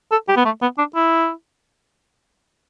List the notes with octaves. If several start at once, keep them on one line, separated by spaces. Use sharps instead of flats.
A4
G4
B3
A3
B3
D4
E4